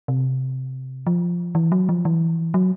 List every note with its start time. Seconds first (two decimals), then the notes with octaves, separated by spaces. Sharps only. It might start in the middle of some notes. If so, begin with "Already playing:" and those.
0.08 C3
1.07 F3
1.55 E3
1.72 F#3
1.89 F3
2.05 E3
2.54 F#3